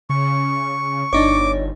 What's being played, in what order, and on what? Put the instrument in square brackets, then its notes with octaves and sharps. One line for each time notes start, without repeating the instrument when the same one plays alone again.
[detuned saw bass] C#3 [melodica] C#6
[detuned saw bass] G1 [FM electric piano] D4 D#4 C#5 [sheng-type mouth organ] D6